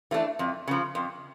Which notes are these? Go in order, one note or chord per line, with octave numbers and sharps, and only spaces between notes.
E3 A3 D4
F2
C#3 F3
F2